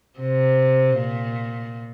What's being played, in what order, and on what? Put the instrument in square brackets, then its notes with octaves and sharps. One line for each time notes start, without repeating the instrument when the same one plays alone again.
[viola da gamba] C3
A#2